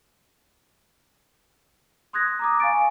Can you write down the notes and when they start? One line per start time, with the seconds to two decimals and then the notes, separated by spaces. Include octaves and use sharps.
2.13 C6 D#6 F#6 G#6 A#6
2.39 A#5 D6 D#6
2.60 F5 G#5 C#6 A6 D7